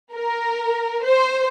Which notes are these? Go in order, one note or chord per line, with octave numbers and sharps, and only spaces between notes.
A#4
C5